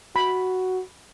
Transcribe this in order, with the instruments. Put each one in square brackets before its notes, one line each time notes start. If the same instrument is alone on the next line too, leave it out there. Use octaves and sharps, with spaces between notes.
[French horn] F#4 [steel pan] B5